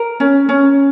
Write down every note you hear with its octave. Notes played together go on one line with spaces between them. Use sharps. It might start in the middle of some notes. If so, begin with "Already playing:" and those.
Already playing: A#4
C#4
C#4